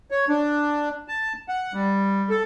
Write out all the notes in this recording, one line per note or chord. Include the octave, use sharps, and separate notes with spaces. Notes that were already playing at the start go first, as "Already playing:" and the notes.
C#5
D4
A5
F#5
G3
A4